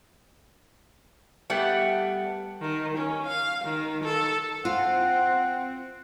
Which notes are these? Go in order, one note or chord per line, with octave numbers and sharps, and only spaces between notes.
G3 A3 B3
D#3
C#4
F5
D#3
A4
C4 F4 F#5